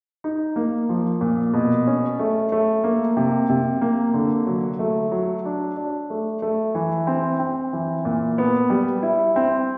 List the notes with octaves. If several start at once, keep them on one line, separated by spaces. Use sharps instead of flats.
D#4
A#3
F3
A#2
B2
C#4
A3
A3
A#3
C3
C3
A#3
D3
F#3
A3
F#3
D4
D4
A3
A3
E3
C4
C4
E3
A#2
B3
G3
E4
C4